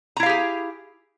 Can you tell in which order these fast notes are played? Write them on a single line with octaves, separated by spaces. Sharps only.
A#5 E4 F5 G4 G#4